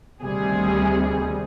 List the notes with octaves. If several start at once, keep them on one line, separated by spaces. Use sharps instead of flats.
D2 C3 D#3 G3 G#4